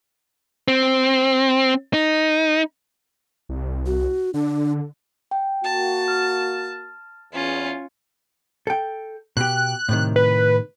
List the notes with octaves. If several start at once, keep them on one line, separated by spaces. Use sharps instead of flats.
C4
D#4
C2
F#4
D3 D4
G5
A#3 F#4 A5
F6
E2 C#4 F4
A4 G5
B2 G4 F#6
A2 C3 D#3
B4